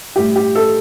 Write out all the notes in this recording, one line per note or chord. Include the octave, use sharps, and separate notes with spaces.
A2 G3 G4
G4
A4